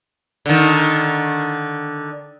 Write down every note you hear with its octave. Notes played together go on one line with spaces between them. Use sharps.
D3 D#3